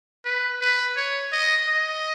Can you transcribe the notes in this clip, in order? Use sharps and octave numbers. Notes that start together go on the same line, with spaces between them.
B4
B4
C#5
D#5
D#5